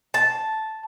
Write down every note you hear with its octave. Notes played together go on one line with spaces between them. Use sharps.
A5